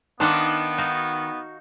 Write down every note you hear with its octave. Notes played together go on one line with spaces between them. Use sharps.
D#3 B3 D4 C5 D#5 F5 F#5 D6
D#4 F#4 F5